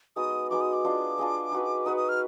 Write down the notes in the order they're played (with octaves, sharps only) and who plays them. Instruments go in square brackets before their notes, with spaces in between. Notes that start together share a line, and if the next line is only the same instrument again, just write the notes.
[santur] G#3 B3 D#4 F#4 [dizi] D#6
[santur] G#3 B3 D#4 F#4 [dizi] D6
[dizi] D#6
D6
[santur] D4 F4 G#4 D#5
D4 F4 G#4 D#5
D#4 F#4 B4
[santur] D#4 F#4 B4 [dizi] D#6
[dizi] D#6
F6